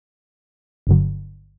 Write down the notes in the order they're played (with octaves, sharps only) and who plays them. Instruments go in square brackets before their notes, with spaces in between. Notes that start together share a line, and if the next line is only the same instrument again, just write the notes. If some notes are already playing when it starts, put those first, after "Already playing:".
[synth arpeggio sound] G1 G2 D3 F#3